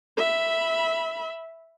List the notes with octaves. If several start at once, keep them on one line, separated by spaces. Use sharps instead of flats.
E5 B5